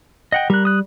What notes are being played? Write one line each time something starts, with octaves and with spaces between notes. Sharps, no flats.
D#5 F#5 G5
G3 A#4 F#6
D#6 F#6